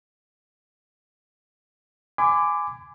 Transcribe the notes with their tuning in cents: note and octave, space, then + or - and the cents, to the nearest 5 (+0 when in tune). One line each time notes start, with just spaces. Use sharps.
G#5 +0 B5 +40 D6 +0